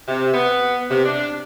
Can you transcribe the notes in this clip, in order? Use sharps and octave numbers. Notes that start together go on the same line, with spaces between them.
C3
B3
C3
D4